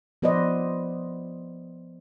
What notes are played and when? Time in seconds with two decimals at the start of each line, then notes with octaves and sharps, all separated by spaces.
0.22 F3 B3 B4 C5 D5 D#5